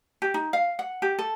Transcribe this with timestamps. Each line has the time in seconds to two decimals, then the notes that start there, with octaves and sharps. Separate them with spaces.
0.22 G4
0.34 D#4
0.53 F5
0.79 F#5
1.02 G4
1.19 A4